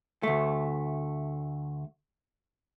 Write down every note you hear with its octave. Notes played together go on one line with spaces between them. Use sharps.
D2 A3